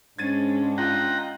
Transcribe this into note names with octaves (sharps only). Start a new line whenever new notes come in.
G#2 G#3 C#4 D4 G#6 A6 D#7
D#4 F4 F#5 G5 A#5